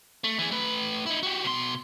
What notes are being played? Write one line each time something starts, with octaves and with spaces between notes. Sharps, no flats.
A3
E3 G#4
A3 B4
D#4 E4
F#4 G4
B2 C6